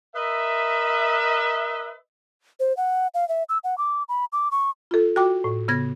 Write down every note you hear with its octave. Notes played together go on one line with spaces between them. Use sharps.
A#4 B4 D#5 E5
C5
F#5
F5
E5
E6
F#5
D6
B5
D6
C#6
F4 A4
F#4 G5 D6
A2
C#3 B3 G#6 A#6